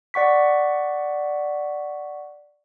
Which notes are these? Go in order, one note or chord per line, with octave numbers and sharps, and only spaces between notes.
D5 F#5 C#6 B6